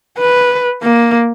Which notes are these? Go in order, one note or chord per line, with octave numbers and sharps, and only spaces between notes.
B4
A#3